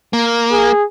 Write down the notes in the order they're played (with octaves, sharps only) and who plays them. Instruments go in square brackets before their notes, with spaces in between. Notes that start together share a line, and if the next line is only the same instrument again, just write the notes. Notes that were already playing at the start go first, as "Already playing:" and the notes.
[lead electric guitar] A#3
[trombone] G#4